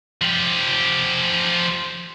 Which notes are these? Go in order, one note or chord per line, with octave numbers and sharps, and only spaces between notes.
F3 G4